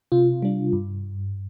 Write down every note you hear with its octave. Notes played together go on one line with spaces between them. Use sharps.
C3 F4
G3 D4
G2